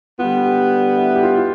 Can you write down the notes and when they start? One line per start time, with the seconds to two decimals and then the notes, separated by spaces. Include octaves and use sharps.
0.19 D3 G3 B3 F4
0.45 G4
0.97 E4
1.15 G4
1.23 F4
1.37 F4